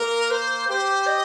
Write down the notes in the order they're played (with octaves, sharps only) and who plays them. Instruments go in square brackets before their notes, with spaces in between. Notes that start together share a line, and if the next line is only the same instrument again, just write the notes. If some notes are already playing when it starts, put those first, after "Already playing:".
Already playing: [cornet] A#3 [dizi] A#4
[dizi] C5
[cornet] G4 [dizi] C5
[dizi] D#5